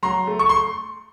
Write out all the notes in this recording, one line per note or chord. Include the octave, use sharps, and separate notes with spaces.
F#3 A#5 C6
A3
C#6
C6